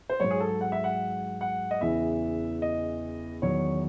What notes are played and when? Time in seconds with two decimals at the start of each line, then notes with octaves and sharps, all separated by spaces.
0.10 C5
0.20 G#2 F#3 C#5
0.30 G#4
0.41 A4
0.61 F#5
0.72 E5
0.84 F#5
1.41 F#5
1.71 D#5
1.81 E2 C#3 E3 E5
2.62 D#5
3.42 E2 D#3 F#3 C#5